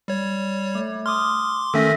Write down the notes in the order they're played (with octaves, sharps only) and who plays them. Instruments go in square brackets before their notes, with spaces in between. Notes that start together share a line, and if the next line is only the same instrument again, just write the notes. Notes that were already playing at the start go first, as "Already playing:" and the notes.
[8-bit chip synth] G3 C#5
[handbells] A3
[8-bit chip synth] C6 D6 [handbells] D#6 F6
[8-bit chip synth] D#3 A3 C#4 [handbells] A4 E5 A#6